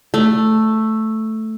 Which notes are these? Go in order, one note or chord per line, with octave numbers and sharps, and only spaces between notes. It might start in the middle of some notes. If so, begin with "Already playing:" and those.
A3